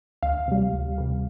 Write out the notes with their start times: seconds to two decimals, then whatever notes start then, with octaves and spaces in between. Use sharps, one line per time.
0.23 D2 F5
0.48 C3 G3
0.73 D2
0.98 C3 G3